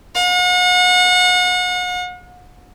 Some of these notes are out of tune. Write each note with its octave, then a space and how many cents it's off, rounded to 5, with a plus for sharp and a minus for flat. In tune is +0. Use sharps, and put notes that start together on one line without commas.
F#5 -40